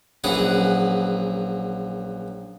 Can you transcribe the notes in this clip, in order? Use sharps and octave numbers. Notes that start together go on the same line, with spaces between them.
A#1 F#2 E3 G#4 B4 F#5